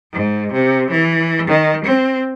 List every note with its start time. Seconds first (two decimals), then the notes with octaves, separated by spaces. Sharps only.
0.13 G#2
0.53 C3
0.91 E3
1.48 D#3
1.85 C4